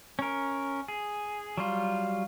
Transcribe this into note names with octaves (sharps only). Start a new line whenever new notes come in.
C#4 A#4
G#4
F#3 G3 F4